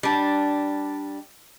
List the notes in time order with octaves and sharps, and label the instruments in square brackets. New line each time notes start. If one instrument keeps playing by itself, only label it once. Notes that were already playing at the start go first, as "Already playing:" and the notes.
[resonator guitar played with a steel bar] G3 D4